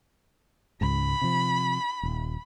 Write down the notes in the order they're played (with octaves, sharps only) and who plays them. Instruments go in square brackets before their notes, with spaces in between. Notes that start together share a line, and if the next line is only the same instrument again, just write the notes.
[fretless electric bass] C#2 G#2 [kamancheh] B5
[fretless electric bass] C3 F3
D#1